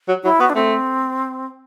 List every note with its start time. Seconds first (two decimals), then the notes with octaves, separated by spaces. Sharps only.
0.09 F#3
0.24 F#3 E4
0.40 B3 F#4
0.50 D4
0.55 A3 C4